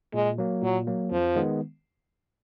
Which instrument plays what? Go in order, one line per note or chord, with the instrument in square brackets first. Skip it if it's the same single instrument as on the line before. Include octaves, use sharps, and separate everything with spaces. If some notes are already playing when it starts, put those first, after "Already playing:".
[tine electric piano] A#2 [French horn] G#3
[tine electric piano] F#3 A#3
[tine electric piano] A#2 [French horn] F#3
[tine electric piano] F#3 A#3
[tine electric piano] F2 [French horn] F3
[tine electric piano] D#3 G#3 B3